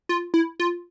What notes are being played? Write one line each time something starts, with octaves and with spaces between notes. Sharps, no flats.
F4
E4
F4